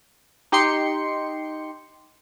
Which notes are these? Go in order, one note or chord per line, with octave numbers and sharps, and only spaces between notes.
D#4 G4 G5 C6 C#7